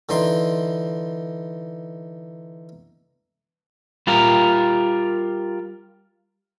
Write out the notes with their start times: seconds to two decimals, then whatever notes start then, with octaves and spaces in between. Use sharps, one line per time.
0.09 D3 E3 D#4 D5 C6
4.07 G3 F4 G4 A#4